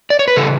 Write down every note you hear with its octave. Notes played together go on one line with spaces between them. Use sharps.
D5
C#5
B4
C#3 E3 G3 A4